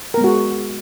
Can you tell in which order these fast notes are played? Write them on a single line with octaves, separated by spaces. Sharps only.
A#4 B3 G#3 F#4 G#4